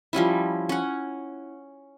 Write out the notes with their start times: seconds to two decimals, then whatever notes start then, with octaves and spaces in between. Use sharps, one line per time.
0.13 F3 G3 C#4 E4
0.69 C#4 F#5